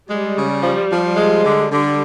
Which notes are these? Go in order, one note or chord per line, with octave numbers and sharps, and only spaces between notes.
G3 G#3
C#3
F3
F3
G#3
D3
D3 G3